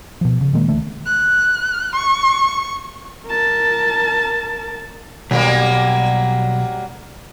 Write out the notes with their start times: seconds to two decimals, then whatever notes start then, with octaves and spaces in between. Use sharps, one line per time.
0.21 B2 F3
0.41 C#3
0.53 A#2 D#3 G#3 A#3
0.68 C#2 D3 E3 A3
1.06 F#6
1.95 C#6
3.27 A#4 A5
5.31 B1 F#3 G3 A#3